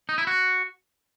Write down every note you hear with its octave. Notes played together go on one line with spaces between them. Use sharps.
D#4
E4
F#4